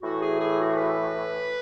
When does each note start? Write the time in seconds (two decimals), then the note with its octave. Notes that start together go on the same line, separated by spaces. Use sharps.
0.02 A2 E3 F#4
0.20 G#4
0.38 G#4
0.57 F#4
0.76 B4